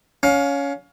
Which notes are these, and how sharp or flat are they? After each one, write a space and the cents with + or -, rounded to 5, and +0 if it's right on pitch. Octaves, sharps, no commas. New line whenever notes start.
C#4 +15 F5 +25